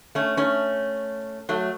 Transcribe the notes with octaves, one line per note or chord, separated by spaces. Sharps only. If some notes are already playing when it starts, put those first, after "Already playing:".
A3 C#4
A3 C#4
F#3 A3